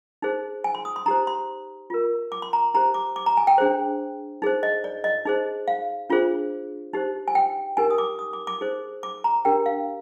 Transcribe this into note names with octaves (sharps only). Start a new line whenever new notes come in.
D#4 G#4 C5
G#5
C6
D#6
C6
D#4 G4 C5 A#5
C6
F4 A#4
D6
C6
A#5
D#4 G4 C5 A#5
D6
D6
A#5
G#5
G5
D4 G#4 C5
D#4 G#4 C5
D#5
D5
D#5
D#4 G#4 C5
F5
D4 F4 G#4 C5
D#4 G4 C5
G#5
G5
D#4 G4 A#4 G#5
D#6
D6
D#6
D6
D6
D#4 G#4 C5
D6
A#5
D4 G4 A#4 G5
F5